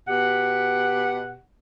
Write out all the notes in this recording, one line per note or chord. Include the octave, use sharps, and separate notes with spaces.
B2 G4 F#5